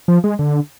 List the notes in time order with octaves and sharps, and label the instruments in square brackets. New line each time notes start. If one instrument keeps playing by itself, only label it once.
[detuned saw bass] F3
G#3
D3